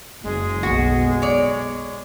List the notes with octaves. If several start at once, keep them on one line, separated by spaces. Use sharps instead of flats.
F#1 G#3
B1 F#4
C#5 D5